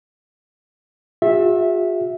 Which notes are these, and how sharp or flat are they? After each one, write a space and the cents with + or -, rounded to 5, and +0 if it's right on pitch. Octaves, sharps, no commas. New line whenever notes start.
F4 +45 G#4 -45 E5 -5